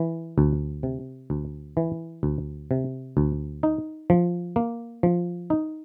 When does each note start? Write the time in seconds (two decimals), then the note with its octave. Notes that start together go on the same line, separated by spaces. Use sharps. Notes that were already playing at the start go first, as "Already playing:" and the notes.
Already playing: E3
0.38 D2
0.83 C3
1.30 D2
1.77 E3
2.23 D2
2.71 C3
3.17 D2
3.63 D#4
4.10 F3
4.56 A#3
5.03 F3
5.50 D#4